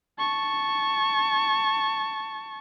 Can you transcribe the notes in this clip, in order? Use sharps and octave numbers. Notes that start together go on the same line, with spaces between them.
A5 C#6